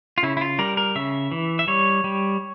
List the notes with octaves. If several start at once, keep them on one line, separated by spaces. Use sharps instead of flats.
F4
C#3 E4
E4
F4
G3 A#4
A#4
C#3 E5
E3
E5
G3 C#5
G3